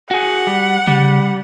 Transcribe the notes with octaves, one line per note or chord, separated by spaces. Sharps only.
F#4 G#4 F#5
G3
C#3 G3